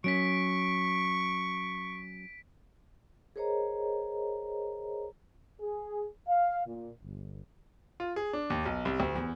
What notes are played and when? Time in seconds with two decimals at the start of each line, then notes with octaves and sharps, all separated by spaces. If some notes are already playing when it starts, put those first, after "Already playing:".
0.04 F#3 C#4 C#6 B6 D7
3.36 G#4 A#4 C5 C#5 D#5 A#5
5.60 G#4
6.27 F5
6.66 A#2
7.02 G1
8.00 F4
8.16 G#4
8.33 D4
8.50 D#2
8.66 B1
8.85 C2
9.00 D2
9.15 E2